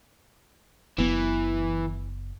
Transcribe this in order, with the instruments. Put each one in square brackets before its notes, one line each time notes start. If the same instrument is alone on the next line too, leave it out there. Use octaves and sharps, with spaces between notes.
[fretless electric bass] F#1 B3 [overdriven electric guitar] E3